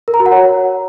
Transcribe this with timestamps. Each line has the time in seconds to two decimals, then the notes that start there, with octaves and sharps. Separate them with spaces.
0.08 A#4
0.14 A#5
0.20 F#4
0.26 F#5
0.32 C#5